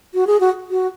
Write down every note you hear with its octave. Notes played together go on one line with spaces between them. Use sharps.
F#4
G#4
F#4
F#4